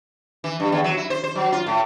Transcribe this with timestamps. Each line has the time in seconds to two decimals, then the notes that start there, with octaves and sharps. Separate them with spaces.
0.44 E3
0.60 G2
0.72 E2
0.84 F#3
0.97 E4
1.10 C5
1.24 C5
1.35 F#3
1.52 F4
1.66 A2